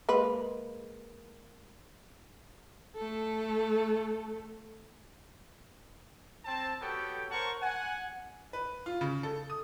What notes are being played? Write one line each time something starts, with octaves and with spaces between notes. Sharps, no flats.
G#3 A#3 B4
A3 A4
C4 A5
B3 F#4 G4 A4 C#5 G5
A#4 C5 C#5 F#5 A5 C#6
F#5 G#5
B4
F4
C#3
A4
D#6